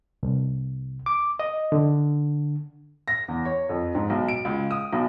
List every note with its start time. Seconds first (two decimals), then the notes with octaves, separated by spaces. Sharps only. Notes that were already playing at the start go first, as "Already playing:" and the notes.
0.23 C2
1.06 D6
1.39 D#5
1.72 D3
3.08 A#6
3.28 E2
3.45 C#5
3.69 F2
3.95 G#2
4.10 B1
4.28 D7
4.45 C#2
4.71 D#6
4.93 B1